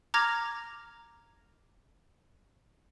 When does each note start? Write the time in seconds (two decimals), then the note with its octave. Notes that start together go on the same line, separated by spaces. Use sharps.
0.14 A#5 D6 F6 G#6 A#6 F7